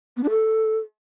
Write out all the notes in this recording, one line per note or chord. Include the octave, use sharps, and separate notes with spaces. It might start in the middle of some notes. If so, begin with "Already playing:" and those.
B3
D4
A4